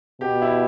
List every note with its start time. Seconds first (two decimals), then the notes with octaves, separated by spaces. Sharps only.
0.21 B2 G4
0.42 E4